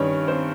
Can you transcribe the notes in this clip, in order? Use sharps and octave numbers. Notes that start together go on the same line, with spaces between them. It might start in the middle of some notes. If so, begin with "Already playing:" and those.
Already playing: G2 D#3 G3 C#4 C#5
C4 C5